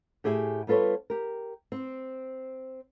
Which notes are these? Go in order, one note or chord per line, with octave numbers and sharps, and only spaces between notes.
A2 G4 G#4 E5 G#5
G3 B3 F4 A4 B4 C#5
G4 A#4
C4